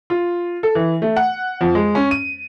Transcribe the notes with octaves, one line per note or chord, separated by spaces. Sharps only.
F4
A4
E3
A3
F#5
F2
G#3
C#4
D#7